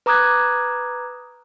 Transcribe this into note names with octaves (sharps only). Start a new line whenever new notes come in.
B4 A#5 D6 D#6 F#6 G#6